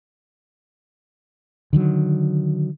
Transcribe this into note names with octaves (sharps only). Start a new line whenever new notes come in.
D3 D#3 F#3